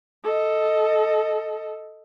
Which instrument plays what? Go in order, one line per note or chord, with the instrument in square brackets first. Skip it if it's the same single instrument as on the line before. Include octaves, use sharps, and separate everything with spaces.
[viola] A4 D#5